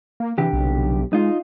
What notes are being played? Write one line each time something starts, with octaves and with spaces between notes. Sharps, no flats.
A#3
C2 D3 E3 G4
B1
G#3 D#4 F4